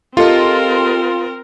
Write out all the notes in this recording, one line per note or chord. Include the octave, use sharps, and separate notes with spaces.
C4 F4 G4 A4 A#4 D#5